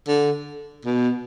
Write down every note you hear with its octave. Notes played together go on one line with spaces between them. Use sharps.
D3
B2